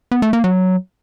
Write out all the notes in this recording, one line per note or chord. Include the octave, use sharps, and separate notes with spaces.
B3
A3
A#3
F#3